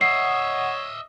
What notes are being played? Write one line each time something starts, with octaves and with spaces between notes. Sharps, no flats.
C#5 D#5 E5 F#5 D#6 C7